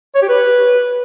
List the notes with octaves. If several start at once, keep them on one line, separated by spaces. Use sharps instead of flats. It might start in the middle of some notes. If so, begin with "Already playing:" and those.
C#5
G4
B4